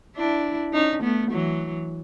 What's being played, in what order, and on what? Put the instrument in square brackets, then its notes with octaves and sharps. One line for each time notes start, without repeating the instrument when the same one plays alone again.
[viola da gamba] D4 E4
C#4 D#4
A3 B3
E3 F#3